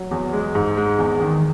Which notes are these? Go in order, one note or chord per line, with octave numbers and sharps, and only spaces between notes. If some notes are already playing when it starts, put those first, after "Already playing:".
Already playing: F#3
E2
G#3
G#2
G#3
E2
D#3